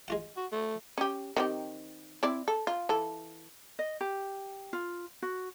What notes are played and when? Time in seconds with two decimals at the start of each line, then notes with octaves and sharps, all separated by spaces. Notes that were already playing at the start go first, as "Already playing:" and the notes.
0.08 G#3 F4 F#5
0.37 F#4
0.52 A3
0.98 C#4 G4
1.36 D#3 C4 G4
2.23 C4 E4 D5
2.48 A4
2.67 F4
2.89 E3 A4
3.79 D#5
4.01 G4
4.73 F4
5.22 F#4